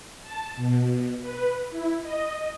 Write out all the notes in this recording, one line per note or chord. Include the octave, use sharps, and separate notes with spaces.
A5
B2
B4
E4
D#5